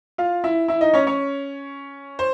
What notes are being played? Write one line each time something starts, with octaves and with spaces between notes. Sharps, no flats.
F4 F5
E4 E5
E4 E5
D#4 D#5
C#4 C#5
C#4 C#5
C5